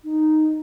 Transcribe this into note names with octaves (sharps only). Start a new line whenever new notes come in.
D#4